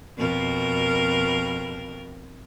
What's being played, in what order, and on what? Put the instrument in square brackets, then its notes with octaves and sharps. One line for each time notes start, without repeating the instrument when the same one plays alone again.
[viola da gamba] F2 B2 A#4